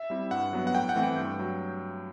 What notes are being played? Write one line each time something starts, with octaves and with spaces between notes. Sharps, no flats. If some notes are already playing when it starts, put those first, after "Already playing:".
Already playing: E5
G3 C4 E4
G2 F#5
F#3 B3
F#5
A2 G5
F#5
E3 A3 C4
G5
G2
F#3